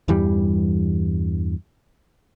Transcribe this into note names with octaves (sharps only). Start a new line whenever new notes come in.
E2 G2 E3 G3